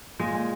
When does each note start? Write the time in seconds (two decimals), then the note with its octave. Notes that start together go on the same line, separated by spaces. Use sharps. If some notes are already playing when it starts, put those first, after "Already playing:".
0.19 A#2 G#3
0.34 A#2